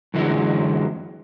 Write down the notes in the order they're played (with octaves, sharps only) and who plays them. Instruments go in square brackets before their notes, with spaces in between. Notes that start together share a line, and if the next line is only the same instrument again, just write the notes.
[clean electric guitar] F#2 D3 E3 F#3 G#3